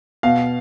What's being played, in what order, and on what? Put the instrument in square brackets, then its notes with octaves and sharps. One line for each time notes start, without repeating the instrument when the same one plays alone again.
[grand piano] B2 F5